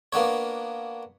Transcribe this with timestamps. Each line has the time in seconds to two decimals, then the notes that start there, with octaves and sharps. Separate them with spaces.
0.13 A#3 B3 D4 C#5